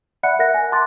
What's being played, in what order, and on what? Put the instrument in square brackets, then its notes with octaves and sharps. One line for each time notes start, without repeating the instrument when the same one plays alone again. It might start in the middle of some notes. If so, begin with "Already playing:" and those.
[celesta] D5 E5 F#5 B5 F#6 C#7
A#4 E5 F#5 F#6 A#6
G#5
A5 C6 D6 F#6 A6